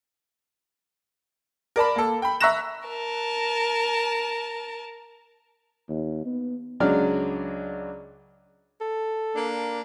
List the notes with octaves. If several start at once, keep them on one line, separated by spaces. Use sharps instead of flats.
A#4 D5 A5 B5
A#3 A4
G5 B5
E5 A#5 C#6 F#6 A#6 E7
A#4 A5
D#2
B3
C#2 F#3 G#3 D4 D5 F6
A4
A#3 D4